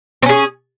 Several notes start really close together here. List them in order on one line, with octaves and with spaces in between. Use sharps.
C4 C#4 G#4